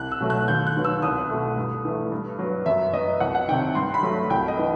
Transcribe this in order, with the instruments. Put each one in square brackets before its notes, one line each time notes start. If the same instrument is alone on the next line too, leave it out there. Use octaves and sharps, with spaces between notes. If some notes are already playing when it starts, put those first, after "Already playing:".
Already playing: [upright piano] C2 F#6
E6
B2 F#3 A3
F#6
D#2 G6
F#6
D#3 F#3 B3
E6
C2 D#6
B2 A3
G2
E3 A3
G2
F#3 B3
F#2 E5
F#3 B3 D#5
C2 F#5
F#5
C3 D#3 G5
G2 C6
B5
F#3 A3
C2 G5
D#5
E3 B3